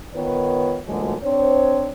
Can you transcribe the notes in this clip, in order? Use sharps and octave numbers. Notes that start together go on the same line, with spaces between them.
D#3 B3 F4 B4 C#5
D2 A#2 E3 F#3 G#3
C4 D4 C5 C#5